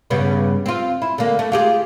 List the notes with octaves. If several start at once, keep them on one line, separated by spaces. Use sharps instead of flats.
G2 C#3 B3
C4 F4
E4
D3 A#3
A3
F4 G4 G#4